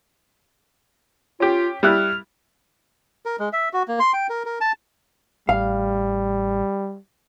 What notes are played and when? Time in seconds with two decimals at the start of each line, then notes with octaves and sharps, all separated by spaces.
1.40 C#4 F4 G4
1.83 G3 E4 F6 F#6
3.26 A#4
3.39 G#3
3.53 E5
3.73 F#4
3.88 A#3
4.00 C6
4.13 G5
4.30 A#4
4.46 A#4
4.61 A5
5.49 A1 G3 F5